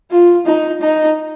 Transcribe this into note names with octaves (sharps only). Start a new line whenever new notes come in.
F4
D#4
D#4